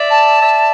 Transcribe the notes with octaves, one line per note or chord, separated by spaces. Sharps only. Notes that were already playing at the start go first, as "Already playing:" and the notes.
Already playing: D5 E5
A5
D5 E5